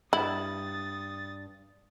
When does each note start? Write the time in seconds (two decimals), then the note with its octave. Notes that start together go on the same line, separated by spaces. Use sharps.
0.13 G2 E4 D#6 A6